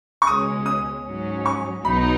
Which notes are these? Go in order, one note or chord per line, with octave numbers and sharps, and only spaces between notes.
C#6
C#2 B2 G#3 C#4 D#6
D#6
G#2 F#3 C#4
C#6
B1 B2 F#3 D#4 B5